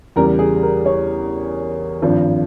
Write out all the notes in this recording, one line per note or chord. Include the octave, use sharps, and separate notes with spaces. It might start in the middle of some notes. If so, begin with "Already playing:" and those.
E2 C#3 G3 A#4
G#4
A#4
C#5
G#1 G2 F3